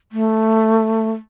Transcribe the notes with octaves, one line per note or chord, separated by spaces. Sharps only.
A3